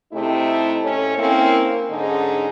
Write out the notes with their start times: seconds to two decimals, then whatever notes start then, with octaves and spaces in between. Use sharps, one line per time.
0.12 C3 A3 D#4 E4
0.83 A2 C#4 A4 C#5
1.17 A#3 C4 C#4 E4
1.90 G#2 D3 C#4 D#4